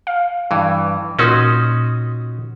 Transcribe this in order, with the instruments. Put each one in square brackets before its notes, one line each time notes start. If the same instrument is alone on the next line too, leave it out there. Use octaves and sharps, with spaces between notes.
[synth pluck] F5
[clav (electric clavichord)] G2 E3
[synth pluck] A#2 C6 D#6 [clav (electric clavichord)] C#4 D#4 F#4